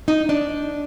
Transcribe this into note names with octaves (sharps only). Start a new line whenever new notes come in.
D#4
D4